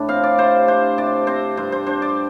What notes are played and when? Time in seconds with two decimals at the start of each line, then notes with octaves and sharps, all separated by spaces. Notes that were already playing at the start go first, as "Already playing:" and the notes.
Already playing: A2 D4
0.09 C4 F5
0.24 D5
0.38 C3 C5
0.68 D4 C5
0.98 C3 D5
1.27 C4 C5
1.57 G2 C5
1.72 C5
1.86 D4 C5
2.02 D5